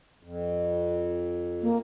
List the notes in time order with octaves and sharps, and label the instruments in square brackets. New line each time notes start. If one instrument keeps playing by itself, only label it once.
[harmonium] F2
[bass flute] A#3